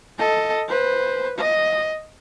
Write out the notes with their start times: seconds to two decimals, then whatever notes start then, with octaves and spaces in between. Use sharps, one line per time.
0.19 A4 D#5
0.69 B4 C5
1.38 D#5